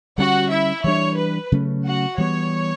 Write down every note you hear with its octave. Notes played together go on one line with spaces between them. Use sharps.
D3 G3 C#4 F#4 F#5
E4 E5
E3 G3 D4 C#5
B4
C#3 F#3 A3 C#4
F#4 F#5
E3 G3 B3 C#5